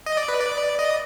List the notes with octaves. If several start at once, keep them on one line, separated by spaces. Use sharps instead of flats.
D#5
D5
B4
D5
D#5